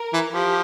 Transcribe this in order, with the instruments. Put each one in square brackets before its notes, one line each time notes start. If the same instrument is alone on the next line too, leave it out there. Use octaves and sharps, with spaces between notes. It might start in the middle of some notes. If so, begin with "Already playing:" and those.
Already playing: [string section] A#4
[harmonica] E3
[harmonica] F3 [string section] G4